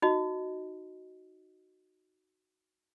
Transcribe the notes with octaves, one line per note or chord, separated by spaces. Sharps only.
D#4 F#4 D#5